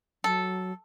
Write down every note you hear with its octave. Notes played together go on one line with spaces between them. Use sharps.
F#3 A4